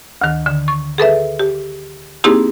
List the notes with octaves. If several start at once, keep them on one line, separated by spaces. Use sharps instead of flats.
D2 D#3
D3
C#6
G#4 A4 B4 E5
G4
A#3 C4 D#4 E4 G4 G#4